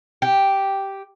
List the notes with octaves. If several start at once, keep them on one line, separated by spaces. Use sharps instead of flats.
G4